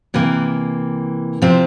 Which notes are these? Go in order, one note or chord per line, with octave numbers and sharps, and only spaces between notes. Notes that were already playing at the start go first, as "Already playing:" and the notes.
C3 E3 A#3
C3 F3 C4 F4